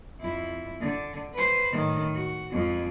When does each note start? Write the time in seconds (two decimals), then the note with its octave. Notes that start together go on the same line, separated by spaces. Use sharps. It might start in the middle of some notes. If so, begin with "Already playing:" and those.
0.21 F2 E4
0.80 D3
1.33 B4 C5
1.71 A2 D#3
2.15 F#4
2.53 F2 G#3